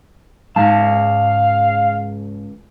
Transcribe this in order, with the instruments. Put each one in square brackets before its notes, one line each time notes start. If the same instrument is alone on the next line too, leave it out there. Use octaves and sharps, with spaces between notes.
[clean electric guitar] C#2 F#3 A5 [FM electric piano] G#2 [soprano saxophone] F5